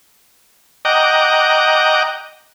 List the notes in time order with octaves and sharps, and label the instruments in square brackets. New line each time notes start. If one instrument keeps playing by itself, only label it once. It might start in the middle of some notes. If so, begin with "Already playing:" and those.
[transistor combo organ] D#5 F#5 G5 A#5 D6